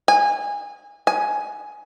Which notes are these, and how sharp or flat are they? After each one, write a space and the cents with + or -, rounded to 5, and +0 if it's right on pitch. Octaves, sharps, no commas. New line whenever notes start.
G#5 -25
G#5 +10